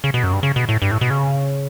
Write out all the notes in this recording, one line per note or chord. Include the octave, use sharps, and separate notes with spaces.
C#3
B2
F#2
G2
C#3
B2
A2
G2
A2
B2
C#3